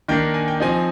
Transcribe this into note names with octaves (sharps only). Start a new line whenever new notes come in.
D#3 A#3 D4 G5
G#5
G5
F3 C4 D#4 G#5